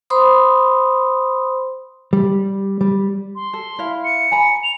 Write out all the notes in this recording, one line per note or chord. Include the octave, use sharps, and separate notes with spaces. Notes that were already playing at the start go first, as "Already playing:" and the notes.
C5 B5 C6 D#6
G3
G3
C6
A4
E4 F5
C#7
G#5 A#5 B5
F7